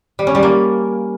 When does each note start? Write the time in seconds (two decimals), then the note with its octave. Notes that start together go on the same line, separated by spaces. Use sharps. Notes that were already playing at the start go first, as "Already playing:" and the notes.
0.19 G3
0.27 C#4
0.35 G3
0.43 A#3